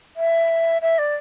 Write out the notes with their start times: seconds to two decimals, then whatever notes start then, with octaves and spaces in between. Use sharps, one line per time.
0.16 E5
0.81 E5
0.98 D5